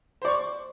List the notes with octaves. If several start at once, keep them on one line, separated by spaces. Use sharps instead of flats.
C5 D5 C#6